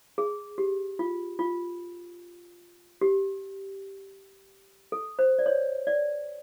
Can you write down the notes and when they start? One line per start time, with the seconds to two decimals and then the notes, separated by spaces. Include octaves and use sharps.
0.18 G#4
0.58 G4
0.99 F4
1.39 F4
3.01 G4
4.92 A4
5.19 C5
5.39 D5
5.46 C#5
5.87 D5